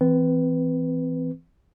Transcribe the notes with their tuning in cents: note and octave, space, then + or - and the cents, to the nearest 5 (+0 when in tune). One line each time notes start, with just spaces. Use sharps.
E3 +0 C4 -25 B4 +0